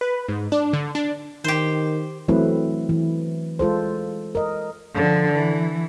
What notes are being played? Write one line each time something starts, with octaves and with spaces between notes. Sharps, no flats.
B4
G#2
D4
D3
D4
D#3 G4 C5
E3 F#3 A3 C4 E4 B4
E3
G#3 F4 A4 C5
A#4 D#5
D3 F3
E3